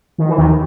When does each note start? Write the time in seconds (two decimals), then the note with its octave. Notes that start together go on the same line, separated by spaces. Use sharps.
0.18 D#3
0.28 E3
0.38 D#2 D#3